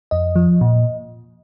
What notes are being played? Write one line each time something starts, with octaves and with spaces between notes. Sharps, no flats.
F2 D#5
F3
A#2